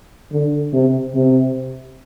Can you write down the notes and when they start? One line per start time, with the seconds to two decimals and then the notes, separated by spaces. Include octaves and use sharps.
0.32 D3
0.73 C3
1.15 C3